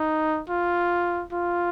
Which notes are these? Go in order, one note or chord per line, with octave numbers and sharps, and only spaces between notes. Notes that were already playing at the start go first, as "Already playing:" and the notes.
Already playing: D#4
F4
F4